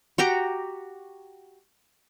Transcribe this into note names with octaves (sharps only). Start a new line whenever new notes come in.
F#4 G4 A#5 D6